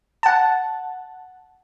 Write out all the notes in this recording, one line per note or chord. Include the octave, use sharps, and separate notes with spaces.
F#5 A5